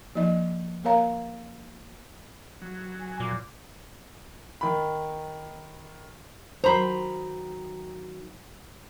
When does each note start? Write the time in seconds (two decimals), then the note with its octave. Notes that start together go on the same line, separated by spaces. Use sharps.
0.15 F3 A#3 D#4 D#5
0.84 A#3 A#4 C#5 F5 A#5
2.62 F#3
2.99 G#5
3.20 A#2 D6
4.61 D#3 B5
6.64 D#3 F#3 C5 A#5 B5